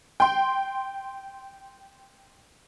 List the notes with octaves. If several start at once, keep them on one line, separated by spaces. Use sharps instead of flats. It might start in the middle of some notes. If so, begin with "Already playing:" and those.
G5 C6